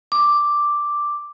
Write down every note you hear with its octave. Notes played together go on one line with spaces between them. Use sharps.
D6